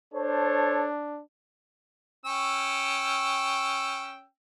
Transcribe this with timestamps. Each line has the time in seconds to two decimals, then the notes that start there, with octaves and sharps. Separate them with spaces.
0.14 D4 A4 C5 C#5
2.25 C#4 G5 E6